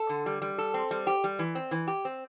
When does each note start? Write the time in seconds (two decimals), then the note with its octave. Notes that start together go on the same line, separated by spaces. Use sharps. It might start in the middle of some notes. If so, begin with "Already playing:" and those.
Already playing: A4
0.09 D3
0.26 G3
0.42 G3
0.58 A4
0.74 C4
0.91 G3
1.07 G4
1.24 G3
1.39 E3
1.55 C4
1.71 E3
1.87 G4
2.05 C4